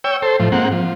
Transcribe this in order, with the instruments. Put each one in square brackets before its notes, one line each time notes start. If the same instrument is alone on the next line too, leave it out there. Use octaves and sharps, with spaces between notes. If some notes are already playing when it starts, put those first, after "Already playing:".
[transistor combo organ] C#5 G5 E6
A4 C5
A2 F3
G#2 A#3 C4 F#5
F3